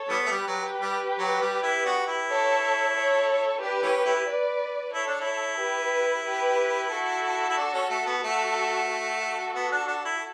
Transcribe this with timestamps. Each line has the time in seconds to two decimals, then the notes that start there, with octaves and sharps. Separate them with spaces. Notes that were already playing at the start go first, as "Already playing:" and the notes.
Already playing: A4 C#5
0.09 E3 G3 B3
0.26 A3
0.31 G3 G4 B4
0.47 F#3
0.81 G3
1.19 F#3
1.41 G3
1.62 E4
1.85 B3 D4 F#4
2.07 E4
2.29 A4 C#5
2.94 A4 C#5
3.60 D4 G4 B4
3.83 E3 A3 C#4
4.05 A3 C#4 E4
4.27 B4 D5
4.93 E4 A4 C#5
5.07 D4
5.20 E4
5.58 G4 B4
6.25 G4 B4
6.91 F#4 A4
7.49 E4
7.57 D4
7.74 C#4
7.90 A3
8.06 B3
8.22 A3 F#4 A4
8.89 F#4 A4
9.56 B3
9.72 D4
9.88 D4
10.05 E4